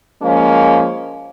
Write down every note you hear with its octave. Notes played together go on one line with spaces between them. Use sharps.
F3 G#3 A#3 C#4